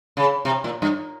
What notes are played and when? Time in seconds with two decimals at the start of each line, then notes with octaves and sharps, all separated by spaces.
0.17 C#3
0.45 C3
0.64 A#2
0.82 G2